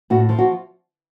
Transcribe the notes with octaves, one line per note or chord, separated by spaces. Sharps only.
A2 F#4
F3
F#4